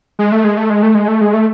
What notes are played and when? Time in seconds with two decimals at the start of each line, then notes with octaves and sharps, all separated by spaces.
0.19 G#3
0.32 A3
0.44 G#3
0.57 A3
0.70 G#3
0.83 A3
0.95 G#3
1.08 A3
1.21 G#3
1.34 A3